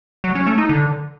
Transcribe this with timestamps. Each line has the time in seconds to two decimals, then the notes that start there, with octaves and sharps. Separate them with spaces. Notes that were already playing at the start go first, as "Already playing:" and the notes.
0.24 F#3
0.35 C#4
0.47 A3
0.58 D#4
0.69 D3